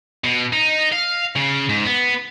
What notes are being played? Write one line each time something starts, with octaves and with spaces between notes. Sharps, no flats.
B2
D#4
F5
C#3
G#2
B3